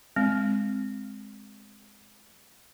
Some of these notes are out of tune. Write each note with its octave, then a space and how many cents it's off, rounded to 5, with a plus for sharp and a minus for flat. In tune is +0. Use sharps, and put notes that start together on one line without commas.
G#3 +0 C4 +0